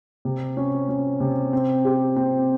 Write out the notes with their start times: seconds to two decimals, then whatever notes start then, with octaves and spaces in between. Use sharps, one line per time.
0.25 C3
0.57 C#4
0.89 C#4
1.20 C3
1.53 C4
1.85 G4
2.16 C4